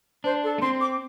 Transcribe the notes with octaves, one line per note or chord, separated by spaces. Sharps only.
D4 C5
A4
A3
C4 C6
D6